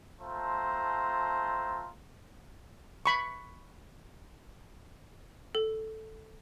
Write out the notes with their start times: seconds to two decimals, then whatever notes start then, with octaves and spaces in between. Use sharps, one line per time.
0.21 A3 C4 F4 C5 A5 A#5
3.06 B5 C#6
5.55 A4